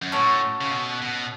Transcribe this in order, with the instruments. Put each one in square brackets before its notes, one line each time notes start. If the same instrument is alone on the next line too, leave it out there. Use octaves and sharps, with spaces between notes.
[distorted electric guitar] F#2
[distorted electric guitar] A2 [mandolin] C#4 F#4 A4 C#5
[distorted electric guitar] C#3
B2
B2